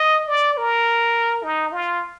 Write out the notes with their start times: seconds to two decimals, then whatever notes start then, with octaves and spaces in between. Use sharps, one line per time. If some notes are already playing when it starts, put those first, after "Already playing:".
Already playing: D#5
0.27 D5
0.57 A#4
1.44 D#4
1.72 F4